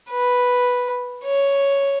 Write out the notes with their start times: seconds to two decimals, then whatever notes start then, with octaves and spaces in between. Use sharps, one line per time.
0.10 B4
1.24 C#5